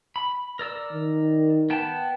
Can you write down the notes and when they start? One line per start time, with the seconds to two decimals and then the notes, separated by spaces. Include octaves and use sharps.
0.16 B5
0.59 A#4 D5 E6
0.92 D#3
1.70 B3 G5 A5